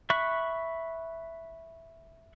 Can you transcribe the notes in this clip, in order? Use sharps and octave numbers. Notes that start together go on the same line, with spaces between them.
E5 B5 C#6 F#6